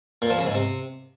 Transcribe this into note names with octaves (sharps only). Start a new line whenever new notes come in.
A#2
F3
C#3
G#2
C3